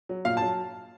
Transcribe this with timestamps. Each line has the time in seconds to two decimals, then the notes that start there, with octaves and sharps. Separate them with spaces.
0.09 F#3
0.25 A#2 F5
0.37 A5
0.42 F#3